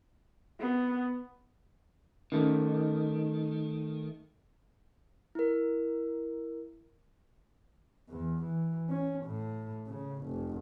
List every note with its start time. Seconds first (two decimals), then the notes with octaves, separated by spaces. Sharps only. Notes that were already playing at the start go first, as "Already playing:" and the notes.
0.59 B3
2.32 D#3 A3 C#4
5.35 E4 A#4
8.09 E2
8.43 E3
8.90 C#4
9.25 A2
9.87 C#3
10.24 F1